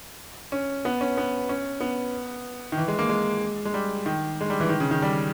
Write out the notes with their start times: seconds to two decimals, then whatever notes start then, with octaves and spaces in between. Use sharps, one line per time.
0.52 C#4
0.85 B3
1.01 C#4
1.17 B3
1.49 C#4
1.80 B3
2.72 D#3
2.78 E3
2.88 G#3
2.99 A#3
3.09 G#3
3.65 G#3
3.74 G3
4.06 D#3
4.41 G#3
4.50 G3
4.60 E3
4.69 D#3
4.80 C#3
4.91 D#3
5.02 G3